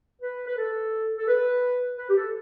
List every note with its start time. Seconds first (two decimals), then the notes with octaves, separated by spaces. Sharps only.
0.22 B4
0.47 B4
0.57 A4
1.18 A4
1.28 B4
1.98 B4
2.09 G4
2.16 A4